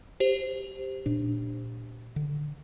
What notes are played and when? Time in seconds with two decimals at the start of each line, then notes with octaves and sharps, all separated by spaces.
0.20 G4 C5
1.06 A#2 D4
2.16 D3